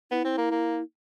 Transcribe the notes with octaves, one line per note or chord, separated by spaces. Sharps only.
B3 E4
C4
A#3
A#3